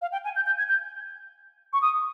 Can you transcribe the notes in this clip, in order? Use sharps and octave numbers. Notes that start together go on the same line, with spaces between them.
F5
G5
G#5
G6
G6
G#6
G6
C#6
D#6